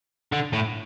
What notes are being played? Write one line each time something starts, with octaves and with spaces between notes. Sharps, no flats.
D3
A2